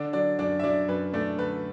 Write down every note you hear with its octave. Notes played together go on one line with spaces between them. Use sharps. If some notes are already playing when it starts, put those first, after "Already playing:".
Already playing: D3 D4 D5
F#3 D4 D5
F#2 D4 D5
E5
F#3 D4 D5
F#2 B4
A3 D4 D5
D3 B4